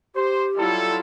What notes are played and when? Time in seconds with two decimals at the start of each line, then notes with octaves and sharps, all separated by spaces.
0.15 G4 C5
0.57 F#3 G3 E4 F4 A4